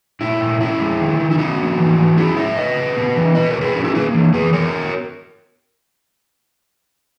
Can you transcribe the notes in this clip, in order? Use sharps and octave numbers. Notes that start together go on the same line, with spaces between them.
A#2 E4
A#2
C#4 E4
G#3
D#3
D#3
E4
C#4 D#4 F#4
A#3
E3
E3
C#4 E4 G#4
G#3 C#5 E5
C#3 B4 D#5
C#3
B3
E3
B2 B4 D#5
A#4 C#5
B2
G#4 B4
C#4 F#4 A#4
E4 G#4
A#3 G#4 B4
E3
E3 G#4 B4
B3 A#4 C#5